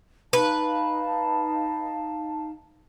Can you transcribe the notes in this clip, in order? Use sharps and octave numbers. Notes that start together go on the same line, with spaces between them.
D#4 B4 F5 A5